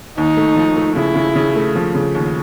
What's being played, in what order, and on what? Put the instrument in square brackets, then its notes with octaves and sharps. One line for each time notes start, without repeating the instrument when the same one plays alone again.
[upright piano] D#2 [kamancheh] D#4
[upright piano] A3
F3
A3
[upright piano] C#3 [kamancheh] E4
[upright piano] C#3
C#3
A3
F3
C#3
D#2